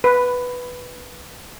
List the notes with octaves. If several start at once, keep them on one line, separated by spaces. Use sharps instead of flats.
B4